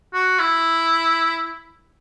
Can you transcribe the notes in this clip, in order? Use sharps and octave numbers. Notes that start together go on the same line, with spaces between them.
F#4
E4